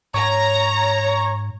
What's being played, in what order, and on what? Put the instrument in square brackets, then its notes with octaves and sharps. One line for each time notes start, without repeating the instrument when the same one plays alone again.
[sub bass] G#2 [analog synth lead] C#5 [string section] A#5